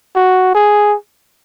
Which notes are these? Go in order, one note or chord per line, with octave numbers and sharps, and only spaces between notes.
F#4
G#4